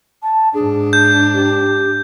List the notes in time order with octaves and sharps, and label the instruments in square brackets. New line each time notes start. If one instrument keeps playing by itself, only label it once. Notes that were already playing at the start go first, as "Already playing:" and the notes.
[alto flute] A5
[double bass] G#2 D4 [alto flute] G#4
[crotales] G6
[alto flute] G4